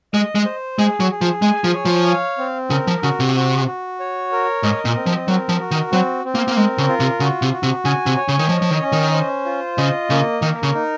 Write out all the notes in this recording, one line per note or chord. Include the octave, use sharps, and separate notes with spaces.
G#3 D#5
G#3
C5
G#3 G#4
F#3
G#4
F3
G#3 G#5
F3
C#5
F3
F5
C4
C#3 A#4
F3
C#3 F#4
C3
F#4
F#4
C#5
A#4
G#2 D#5
A#2
C4
F3
F#3 A#4
F3
F#4
D#3
F#3 C4
C4
A#3
A#3
G#3 A#4
C#3
F4
C3
C#3 F#4
C3
F#4
C3
C#3 G#5
C3
C#5
C#3
D#3
F3 D#5
F3
D#3
C#4
D#3
C5
F4
C#3 D#5
C#3 A#3
D#3 A#4
C#3
D#4